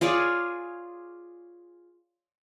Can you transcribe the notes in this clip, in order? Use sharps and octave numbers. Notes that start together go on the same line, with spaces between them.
F4 G#4 C#5 D5